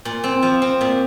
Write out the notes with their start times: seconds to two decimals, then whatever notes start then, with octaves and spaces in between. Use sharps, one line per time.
0.05 A#2
0.24 C4
0.42 F3
0.62 C4
0.81 A#2